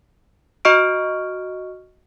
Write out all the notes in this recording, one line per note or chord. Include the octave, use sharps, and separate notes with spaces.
F#4 D#5 C#6 F6 D7